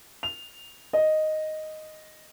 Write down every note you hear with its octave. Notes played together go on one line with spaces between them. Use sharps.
F7
D#5